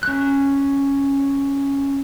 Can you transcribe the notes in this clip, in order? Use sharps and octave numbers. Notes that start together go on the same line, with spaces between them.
C#4 F#6